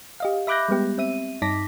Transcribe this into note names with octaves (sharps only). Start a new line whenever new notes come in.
G4 D#5 F5
E5 B5 D6 F#6 G6 A#6
G3 G#3 B3 G4
C4 E5 D#7
G2 D#4 A5 D6 A#6 B6